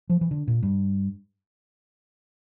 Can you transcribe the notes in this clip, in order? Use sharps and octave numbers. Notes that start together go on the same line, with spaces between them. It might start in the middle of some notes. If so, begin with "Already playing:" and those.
F3
E3
D3
A#2
G2